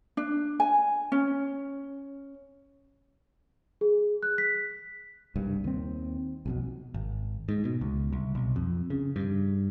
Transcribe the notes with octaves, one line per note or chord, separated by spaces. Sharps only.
D4
G#5
C#4
G#4
F#6
B6
F#1 C2 G2
D#2 C4
B1 F2 B2
G#1
G#2
B2
C#2
C2
B1
F2
C#3
G2